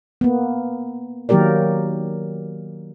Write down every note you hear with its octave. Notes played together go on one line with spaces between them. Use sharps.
A#3 B3
D#3 F#3 A#3 G4 A#4 D5